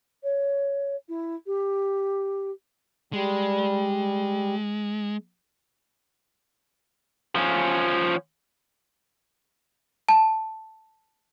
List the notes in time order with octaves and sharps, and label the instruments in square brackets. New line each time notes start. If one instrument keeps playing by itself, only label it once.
[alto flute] C#5
E4
G4
[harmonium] G3 [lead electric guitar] G#3
[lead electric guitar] F3 C#4
[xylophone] A5